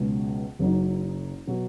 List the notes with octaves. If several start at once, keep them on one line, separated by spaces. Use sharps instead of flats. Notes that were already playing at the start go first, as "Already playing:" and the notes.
Already playing: C#2 B2 F#3 C#4
F#1 F#2 F#3 D#4
B2 F#3